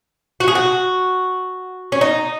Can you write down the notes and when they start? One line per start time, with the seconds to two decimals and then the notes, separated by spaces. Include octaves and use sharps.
0.40 F#4
0.48 G#4
0.55 F#4
1.92 C#4
2.01 D#4